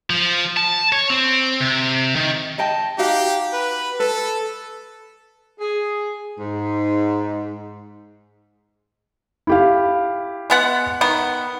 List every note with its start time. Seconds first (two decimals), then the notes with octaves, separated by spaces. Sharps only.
0.10 F3
0.57 A5
0.92 C#5
1.10 C4
1.60 C3
2.16 D#3
2.58 D#5 G5 A5
2.98 D#4 F#4 G4 F5
3.53 B4
4.00 A4 B4
5.59 G#4
6.39 G#2
9.47 E4 G4 F5
10.50 G#3 B3 F#5
11.01 D#3 B3